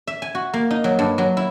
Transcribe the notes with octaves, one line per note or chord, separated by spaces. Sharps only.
E5
G#5
F#4
A#3
D#4
F#3
G2
F#3
E4